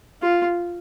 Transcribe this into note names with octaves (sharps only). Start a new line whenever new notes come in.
F4